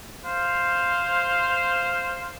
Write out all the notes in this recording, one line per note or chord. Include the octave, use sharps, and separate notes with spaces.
C5 F5